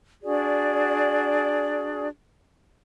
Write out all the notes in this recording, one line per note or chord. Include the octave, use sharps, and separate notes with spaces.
D4 F#4 G#4 D5